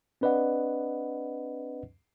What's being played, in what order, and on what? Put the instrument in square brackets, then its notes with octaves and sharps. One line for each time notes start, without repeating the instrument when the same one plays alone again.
[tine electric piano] C4 D4 B4 D5 D#5 F#5